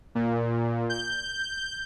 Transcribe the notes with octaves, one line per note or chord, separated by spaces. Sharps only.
A#2
G6